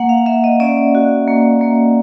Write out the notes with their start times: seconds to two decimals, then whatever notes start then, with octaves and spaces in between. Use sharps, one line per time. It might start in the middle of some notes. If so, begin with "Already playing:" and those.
Already playing: A#3 F#5
0.09 F5
0.26 A#3 E5
0.44 D#5
0.60 C#4 D5
0.95 F#4
1.28 A#3
1.61 A#3